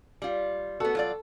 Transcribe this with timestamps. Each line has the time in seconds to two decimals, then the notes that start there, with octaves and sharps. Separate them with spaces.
0.22 G3 F4
0.80 B3 F#4 A4
0.95 F#3 F4 D5